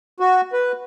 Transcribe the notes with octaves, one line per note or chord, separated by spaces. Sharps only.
F#4
B4